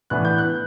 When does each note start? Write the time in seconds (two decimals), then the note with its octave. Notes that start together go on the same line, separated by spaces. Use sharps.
0.10 A2 E3 B3 D4 F#6
0.25 G6
0.38 F#6